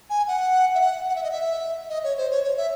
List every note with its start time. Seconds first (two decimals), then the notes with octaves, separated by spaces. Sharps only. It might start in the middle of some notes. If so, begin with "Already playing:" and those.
0.10 G#5
0.27 F#5
0.75 E5
0.81 F#5
1.09 F#5
1.15 E5
1.23 D#5
1.31 E5
1.89 D#5
2.04 C#5
2.17 C5
2.31 C#5
2.44 C#5
2.57 E5